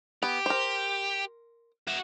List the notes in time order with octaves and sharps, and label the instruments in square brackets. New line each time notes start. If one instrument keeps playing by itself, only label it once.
[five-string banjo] B3 [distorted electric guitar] G4
[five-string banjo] A#4 C5
[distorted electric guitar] F#4 E5